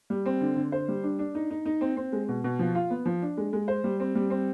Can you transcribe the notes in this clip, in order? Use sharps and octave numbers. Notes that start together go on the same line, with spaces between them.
G3
C4
D3
D3
C5
G3
D4
D4
D#4
D#4
D#4
C4
C4
G#3
B2
B2
F3
F4
B3
F3
D4
G#3
G#3
C5
G3
C4
G3
C4